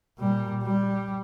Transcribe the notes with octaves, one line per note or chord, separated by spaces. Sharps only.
A#2 G3
G3